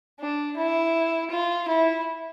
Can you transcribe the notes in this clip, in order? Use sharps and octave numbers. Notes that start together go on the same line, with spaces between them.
D4
E4
F4
E4